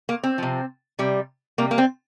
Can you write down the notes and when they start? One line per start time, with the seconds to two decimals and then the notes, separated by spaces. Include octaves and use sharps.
0.09 A#3
0.23 C4
0.38 C3 F3
0.99 C3 G3
1.58 C3 G3 A#3
1.71 A#3
1.78 C4